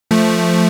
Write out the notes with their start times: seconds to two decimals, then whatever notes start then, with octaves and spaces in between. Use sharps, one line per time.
0.11 F3 A3